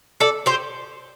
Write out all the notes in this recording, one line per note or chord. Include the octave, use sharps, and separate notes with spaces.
A4 D5
G4 C5